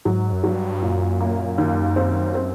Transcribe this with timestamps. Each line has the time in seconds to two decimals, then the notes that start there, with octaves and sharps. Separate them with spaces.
0.05 G#2 F#3
0.33 F#2
0.43 G2 F#3
0.82 F#2 A#2
1.21 A#3
1.58 D#2
1.96 C4
2.35 C4